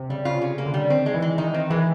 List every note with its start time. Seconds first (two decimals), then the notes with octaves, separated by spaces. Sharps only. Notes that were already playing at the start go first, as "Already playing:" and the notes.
Already playing: C3
0.10 C#3 G3
0.25 C#3 F4
0.42 C#4
0.58 A#3
0.66 D3
0.74 G3
0.90 D#3 C4
1.06 G#3
1.14 E3
1.22 G#3
1.38 D#3 D#4
1.54 D#3 C4
1.70 E3 G#3